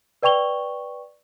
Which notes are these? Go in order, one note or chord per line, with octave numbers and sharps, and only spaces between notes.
B4 D5 G5 C#6 F7 G7